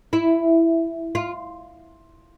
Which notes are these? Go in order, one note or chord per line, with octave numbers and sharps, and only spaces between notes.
E4
F4